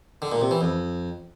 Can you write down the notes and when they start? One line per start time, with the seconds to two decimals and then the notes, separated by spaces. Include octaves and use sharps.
0.22 D3
0.32 A#2
0.41 C3
0.51 E3
0.61 F2